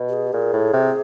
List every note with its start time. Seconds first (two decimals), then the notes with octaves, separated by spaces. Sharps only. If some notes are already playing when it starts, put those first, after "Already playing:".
Already playing: B2
0.09 G4
0.13 G#4
0.27 G4
0.33 A#2 G#4
0.53 A2
0.73 C3